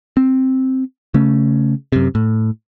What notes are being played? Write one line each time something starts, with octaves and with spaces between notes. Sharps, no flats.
C4
C#3 A3 C#4
F#2 C3
A2